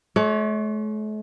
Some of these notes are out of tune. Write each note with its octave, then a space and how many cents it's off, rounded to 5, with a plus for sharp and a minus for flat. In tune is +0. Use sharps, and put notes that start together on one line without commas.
A3 -45 C#5 +20